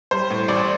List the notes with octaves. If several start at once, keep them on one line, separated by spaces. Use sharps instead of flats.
G3 C5
A2
A1 D5